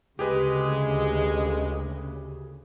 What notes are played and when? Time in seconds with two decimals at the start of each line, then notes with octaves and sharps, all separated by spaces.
0.19 D2 C#3 G#3 G4 G#4 B4